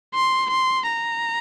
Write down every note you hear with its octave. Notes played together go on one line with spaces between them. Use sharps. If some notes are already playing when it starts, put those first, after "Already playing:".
C6
C6
A#5